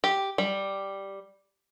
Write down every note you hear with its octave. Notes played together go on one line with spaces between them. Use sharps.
G4
G3